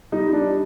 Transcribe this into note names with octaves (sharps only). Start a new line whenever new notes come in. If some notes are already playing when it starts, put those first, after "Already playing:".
G3 D#4
G3 D4